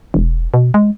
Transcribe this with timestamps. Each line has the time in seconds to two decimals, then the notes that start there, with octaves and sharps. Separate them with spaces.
0.14 E1
0.54 B2
0.74 G#3